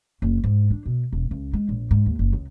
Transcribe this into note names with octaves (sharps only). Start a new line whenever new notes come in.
F#1
G#2
D4
B2
E1
C#2
G#3
A#1
G#2
D#2
F#1
C#2